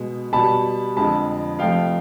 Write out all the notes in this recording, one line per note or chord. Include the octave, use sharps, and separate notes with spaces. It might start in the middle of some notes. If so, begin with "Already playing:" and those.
Already playing: B2 G#3
B2 G3 A5 B5
F2 D3 F3 G#3 A5 B5
F2 C3 F3 A3 F5 G5